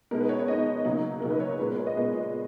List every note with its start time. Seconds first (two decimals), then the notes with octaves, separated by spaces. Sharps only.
0.11 B2 G#3 D#4 A#4
0.21 B4
0.29 C#5
0.39 C#5
0.48 B2 G#3 D#4 D#5
0.85 C#3 F#3 A#3 D#4
1.20 C#3 F#3 A#3 D#4 A#4
1.30 B4
1.40 C#5
1.59 A#2 G#3 B3 B4
1.68 A#4
1.77 C#5
1.87 D#5
1.96 A#2 G#3 B3